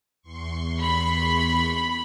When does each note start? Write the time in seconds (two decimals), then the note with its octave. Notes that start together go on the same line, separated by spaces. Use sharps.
0.22 E2 C6 C#6
0.83 B5